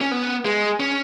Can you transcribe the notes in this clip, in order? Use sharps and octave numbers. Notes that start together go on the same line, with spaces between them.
C#4
B3
G#3
C#4